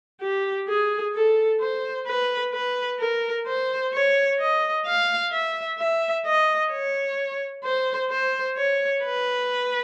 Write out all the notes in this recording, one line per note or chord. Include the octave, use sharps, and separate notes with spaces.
G4
G#4
A4
C5
B4
B4
A#4
C5
C#5
D#5
F5
E5
E5
D#5
C#5
C5
C5
C#5
B4